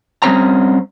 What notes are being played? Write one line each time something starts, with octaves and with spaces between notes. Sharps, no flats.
G3 C4 C#4 C5 A#5